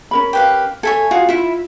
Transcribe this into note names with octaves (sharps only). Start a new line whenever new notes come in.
C#4 A#4 B5
G4 B4 F5
A4 C#5 E5 G#5
F4 F#4 G#4 F5
E4 F4 E5